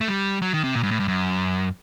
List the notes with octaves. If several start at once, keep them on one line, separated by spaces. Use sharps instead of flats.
A3
G3
F#3
D#3
C3
A#2
G2
A2
G2
F#2